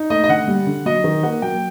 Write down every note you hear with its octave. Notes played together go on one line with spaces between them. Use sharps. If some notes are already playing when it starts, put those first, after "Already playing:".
Already playing: D#4
A3 D#5
D#5
D3 F#5
G3
D3
F#3 D#5
D#3
A#3 F#5
F#3 G5